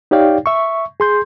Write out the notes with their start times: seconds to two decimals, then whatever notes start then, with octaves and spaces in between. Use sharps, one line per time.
0.11 D#4 G4 C#5 D5 F5 G5
0.46 E5 C#6
1.00 G#4 C6 G6